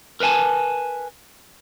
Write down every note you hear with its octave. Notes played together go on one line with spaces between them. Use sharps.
A#4 B4 C#5 G#5 A5